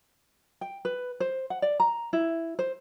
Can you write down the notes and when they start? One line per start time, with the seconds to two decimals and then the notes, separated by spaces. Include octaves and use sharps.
0.61 G5
0.85 B4
1.20 C5
1.50 F#5
1.62 D5
1.80 A#5
2.13 E4
2.59 C5